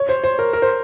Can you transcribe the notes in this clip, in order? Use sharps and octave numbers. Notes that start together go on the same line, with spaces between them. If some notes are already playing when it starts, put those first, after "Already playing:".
Already playing: C#5
C5
C5
A#4
A#4
C5